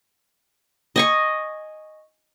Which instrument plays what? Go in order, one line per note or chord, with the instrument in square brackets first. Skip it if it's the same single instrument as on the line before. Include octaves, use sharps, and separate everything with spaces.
[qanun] D#5 G#5 C#6